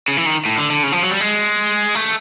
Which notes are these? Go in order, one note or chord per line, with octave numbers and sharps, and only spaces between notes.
C#3
E3
D#3
A2
D3
D3
C#3
F3
F#3
G3
G#3
A3